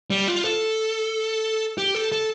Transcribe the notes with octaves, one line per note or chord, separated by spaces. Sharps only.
G3
F4
A4
G4
A4
A4